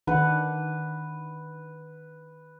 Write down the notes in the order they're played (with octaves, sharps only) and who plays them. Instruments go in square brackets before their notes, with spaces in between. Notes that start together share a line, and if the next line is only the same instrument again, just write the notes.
[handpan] D#3 D4 F#5 [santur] B4